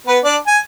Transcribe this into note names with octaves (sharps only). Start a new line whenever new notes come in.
B3 B4
D4 D5
G#5